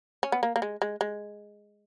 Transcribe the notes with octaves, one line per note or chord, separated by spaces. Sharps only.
C#4
B3
A#3
A#3
G#3
G#3
G#3